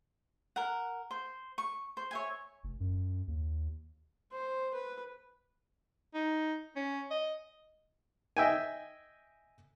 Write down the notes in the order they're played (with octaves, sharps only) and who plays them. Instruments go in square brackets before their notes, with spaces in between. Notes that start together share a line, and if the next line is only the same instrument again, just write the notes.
[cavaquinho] A#4 F#5
C5
C#6
C5
C#5 E5 G#5
[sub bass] F1
F#2
D#2
[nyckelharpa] C5
B4
[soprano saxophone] D#4
C#4
D#5
[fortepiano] D#5 E5 G5 G#5